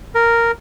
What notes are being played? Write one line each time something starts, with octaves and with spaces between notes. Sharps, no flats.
A#4